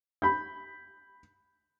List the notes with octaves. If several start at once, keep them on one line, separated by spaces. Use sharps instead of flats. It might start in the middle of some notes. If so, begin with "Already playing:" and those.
B5 G6